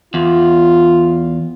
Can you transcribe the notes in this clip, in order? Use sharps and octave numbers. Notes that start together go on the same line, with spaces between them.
E2 F4